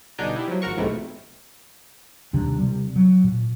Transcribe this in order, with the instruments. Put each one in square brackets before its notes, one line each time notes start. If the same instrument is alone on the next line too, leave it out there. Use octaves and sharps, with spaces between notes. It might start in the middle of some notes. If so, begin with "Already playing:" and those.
[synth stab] G1 B2 D4 D#4 G#5 G6
E4 G4
F3 F#3
G#1 F#4 A#4 C#6
B1 F2 G#2 C3 E3 A3
[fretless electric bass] D#2 C3 G3 D4
C3 G3
F#3
A#2